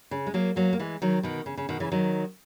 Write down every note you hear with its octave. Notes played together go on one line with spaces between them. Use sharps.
C#3
G#3
F#3 A#3
F#3 A#3
A#3
E3 G#3
D#3 F#3
B2 D#3
C#3
C#3
B2 D#3
C#3 E3
D#3 F#3